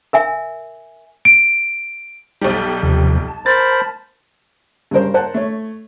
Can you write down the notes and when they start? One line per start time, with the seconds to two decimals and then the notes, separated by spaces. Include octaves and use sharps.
0.13 A#4 E5 G#5
1.25 D7
2.41 B1 G3
2.83 D#2 C3 F3
3.27 A5
3.46 A#4 C5 B5 A6
4.91 G2 C#3 A#4 C5
5.14 A#4 C5 F#5 A5
5.34 A3 C#5